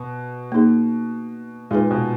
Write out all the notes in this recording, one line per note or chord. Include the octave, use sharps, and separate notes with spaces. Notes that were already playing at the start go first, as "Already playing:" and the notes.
Already playing: B2
A#3 D#4 G#4
A#2 G#3 D#4 G#4 B4
B2